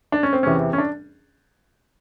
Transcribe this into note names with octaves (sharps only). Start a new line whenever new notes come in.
D4
C#4
C4
E2 C3 E3 C#4
C#4
D4